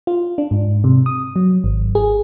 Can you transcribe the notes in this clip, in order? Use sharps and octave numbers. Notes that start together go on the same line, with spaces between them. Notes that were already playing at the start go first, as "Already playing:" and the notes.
F4
D4
G#2
C3
D#6
F#3
G#1
G#4